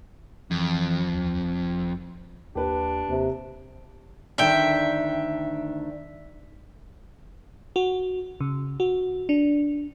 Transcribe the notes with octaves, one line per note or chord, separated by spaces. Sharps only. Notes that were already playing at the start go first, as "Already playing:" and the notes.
F2 E3
D#2
F#1
D#2 D4 G4 B4
D#2 C3
D2 D#3 D4 E5 G5
F#4
C#3
F#4
D4